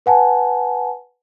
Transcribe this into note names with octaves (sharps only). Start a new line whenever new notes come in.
B4 F#5 G#5 A5